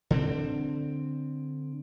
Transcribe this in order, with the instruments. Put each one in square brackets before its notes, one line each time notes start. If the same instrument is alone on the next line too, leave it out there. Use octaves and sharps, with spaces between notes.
[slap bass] D3 C4